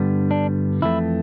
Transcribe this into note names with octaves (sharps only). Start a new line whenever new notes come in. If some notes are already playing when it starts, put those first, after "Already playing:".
Already playing: G2 D3 G3 B3
D4
F2 E3 A3 E4